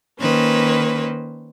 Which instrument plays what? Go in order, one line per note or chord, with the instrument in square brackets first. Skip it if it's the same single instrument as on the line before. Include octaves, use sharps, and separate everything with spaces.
[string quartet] D#3 A#3 C#4 B4 C5